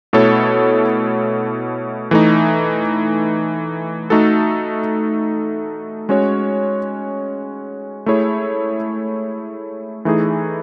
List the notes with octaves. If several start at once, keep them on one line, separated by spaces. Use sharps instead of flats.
B2 A3 E4 A4 C#5
E3 A3 D#4
A3 D#4 F#4 A4
G#3 C#4 F#4 C#5
A3 E4 G#4 C#5
E3 A3 D#4 G#4